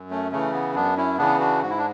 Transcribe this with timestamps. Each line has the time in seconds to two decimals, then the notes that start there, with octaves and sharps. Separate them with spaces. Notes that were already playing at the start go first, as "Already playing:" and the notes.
Already playing: F#2
0.10 A3 C#4
0.32 C#3 E3 A3 C#4
0.53 B3
0.75 F#2 B3 D4
0.97 C#4 E4
1.18 C#3 E3 B3 D4
1.40 D4 F#4
1.62 G#2 F#4
1.70 E4
1.78 D4